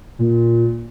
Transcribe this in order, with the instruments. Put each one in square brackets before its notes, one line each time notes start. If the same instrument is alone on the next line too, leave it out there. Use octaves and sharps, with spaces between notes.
[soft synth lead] A#2